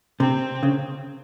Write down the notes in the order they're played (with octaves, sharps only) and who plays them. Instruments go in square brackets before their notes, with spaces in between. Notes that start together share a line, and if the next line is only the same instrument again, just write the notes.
[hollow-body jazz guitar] C3 [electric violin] C4
[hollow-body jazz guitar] C#3